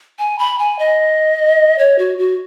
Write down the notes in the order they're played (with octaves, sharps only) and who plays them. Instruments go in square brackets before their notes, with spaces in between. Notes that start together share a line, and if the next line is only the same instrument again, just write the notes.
[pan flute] G#5
B5
G#5
D#5
C#5
F#4
F#4